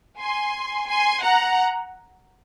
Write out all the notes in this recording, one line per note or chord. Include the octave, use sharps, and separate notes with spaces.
G#5 C6
G#5 C6
F#5 A#5